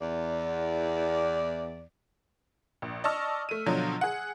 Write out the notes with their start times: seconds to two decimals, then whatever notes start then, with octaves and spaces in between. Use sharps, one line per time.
0.01 E2 D5
2.82 A#1
3.04 D5 D#5 A5 C#6 E6 F6
3.49 A3 D#7
3.66 B2 D3 F3 F#3
4.01 G#4 F#5